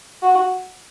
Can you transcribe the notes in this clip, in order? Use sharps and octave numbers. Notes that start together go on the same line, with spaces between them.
F#4